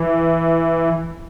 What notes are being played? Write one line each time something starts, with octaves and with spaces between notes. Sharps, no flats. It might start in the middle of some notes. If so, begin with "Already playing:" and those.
Already playing: E3